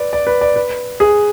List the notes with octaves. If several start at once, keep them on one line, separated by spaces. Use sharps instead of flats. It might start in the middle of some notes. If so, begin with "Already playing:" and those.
Already playing: B4 D5
D5
B4
D5
B4
G#4